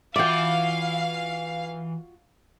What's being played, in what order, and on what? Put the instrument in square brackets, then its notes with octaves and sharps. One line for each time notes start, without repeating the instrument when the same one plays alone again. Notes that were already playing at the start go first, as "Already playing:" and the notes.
[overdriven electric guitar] E3 E5 [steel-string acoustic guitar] F4 F#4 [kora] D5 G5 [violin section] F5